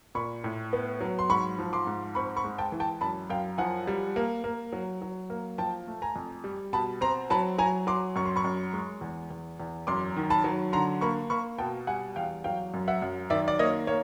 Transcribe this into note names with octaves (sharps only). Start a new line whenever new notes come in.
A#2 B5 C#6
A2
B3
F#3
C6
G#2 B5 C#6
F3
C6 D6
G#2
C4 B5 C#6
B5 C#6
G#3
G5 A5
E3
G5 A5
F#2 A5 B5
F#2 F5 G5
F3 F#5 G#5
G3
A#3
A#3
F#3
F#3
A#3
F3 G5 A5
A3
G#5 A#5
F2
G3
B2 A5 B5
C4 A#5 C6
F#3 A5 B5
F#3 G#5 A#5
F#3 C6 D6
F#2 C#6
C6
B5 C#6
F#2
G#3
E2
E2
E2
F#2 C6 D6
D#3
A5 B5
F#3
D3 A#5 C6
A#3 B5 C#6
A#3 B5 C#6
B2 G5 A5
G3 F#5 G#5
E2 F5 G5
F#3 F5 G5
F#2
E5 F#5
F#2
D#3 D5 E5
D5
A#3 C#5 D#5
A#3 C#5